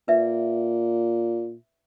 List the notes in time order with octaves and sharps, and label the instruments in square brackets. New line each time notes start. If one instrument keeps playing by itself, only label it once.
[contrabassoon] A#2 [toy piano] B4 D5 E5